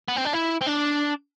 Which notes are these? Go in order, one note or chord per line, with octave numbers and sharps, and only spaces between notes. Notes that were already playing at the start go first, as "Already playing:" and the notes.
B3
C4
D4
E4
C4
D4